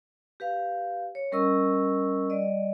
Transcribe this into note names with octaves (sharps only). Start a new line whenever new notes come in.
G4 B4 F5
C#5
G3 C#4 A#4 D#5 C#6 E6
G3 D5 D#5